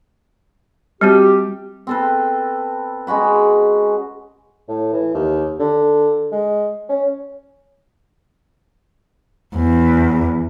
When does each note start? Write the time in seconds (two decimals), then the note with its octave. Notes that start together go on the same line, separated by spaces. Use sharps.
1.01 G3 C4 F#4 G4
1.87 C4 A4 B4
3.07 G#3 C#4 F#4 B5
4.68 A2
4.93 E3
5.14 D#2
5.59 D3
6.32 G#3
6.89 C#4
9.56 E2